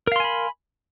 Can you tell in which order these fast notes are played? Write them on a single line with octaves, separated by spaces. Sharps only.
A#4 F5 C6 G#5 B5